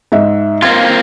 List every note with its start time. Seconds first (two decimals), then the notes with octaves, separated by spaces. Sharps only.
0.12 G#2 E5
0.62 A#3 C4 F4 G#6